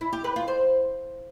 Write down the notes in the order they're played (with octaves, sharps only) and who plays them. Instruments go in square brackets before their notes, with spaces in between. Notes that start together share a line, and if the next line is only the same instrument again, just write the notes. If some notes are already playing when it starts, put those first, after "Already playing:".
[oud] E4
G4
B4
F4
C5